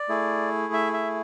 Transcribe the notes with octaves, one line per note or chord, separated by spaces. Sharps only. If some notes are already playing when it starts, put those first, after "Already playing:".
Already playing: D5
A3 E4 G#4
E5
E5